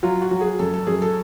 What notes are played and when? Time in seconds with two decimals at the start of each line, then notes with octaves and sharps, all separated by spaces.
0.03 F#3 F4
0.22 F#4
0.31 F#3
0.41 G#4
0.59 F#2 A4
0.74 A4
0.87 F#2 G#4
1.02 A4